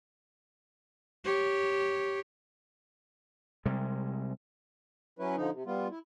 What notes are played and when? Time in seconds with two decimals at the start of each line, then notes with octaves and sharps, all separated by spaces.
1.24 G4 C#5
3.66 C3 G3 G#3
5.19 F#3 C#4 E4 B4
5.37 D3 F3 D#4
5.54 C3
5.66 G3 B3 F4
5.91 E4